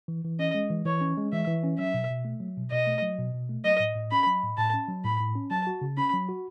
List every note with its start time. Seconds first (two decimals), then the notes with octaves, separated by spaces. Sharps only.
0.08 E3
0.24 E3
0.39 C#4 D#5
0.55 G#3
0.70 E3
0.86 E3 C#5
1.01 C#4
1.17 G#3
1.33 E3 E5
1.47 E3
1.64 C#4
1.78 F#3 E5
1.94 B2
2.10 B2
2.25 A3
2.40 F#3
2.57 B2
2.72 B2 D#5
2.87 A3
3.03 F#3
3.19 B2
3.34 B2
3.49 A3
3.64 F#3 D#5
3.80 A2
3.95 A2
4.11 C#4 B5
4.27 F#3
4.43 A2
4.57 A2 A5
4.73 C#4
4.88 F#3
5.04 A2 B5
5.20 A2
5.35 C#4
5.50 F#3 A5
5.67 F#4
5.81 C#3
5.97 C#4 B5
6.13 F#3
6.29 F#4